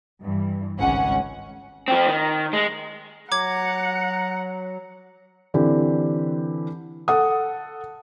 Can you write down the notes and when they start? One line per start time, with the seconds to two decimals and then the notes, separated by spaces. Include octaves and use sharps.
0.21 G2 E3
0.79 G#1 C#2 C#4 F#5
1.88 F3 C4
2.08 D#3
2.53 G#3
3.32 F#3 F#5 A#5 D6 G#6
5.54 D3 E3 C4 G4
7.08 A4 F#5 D#6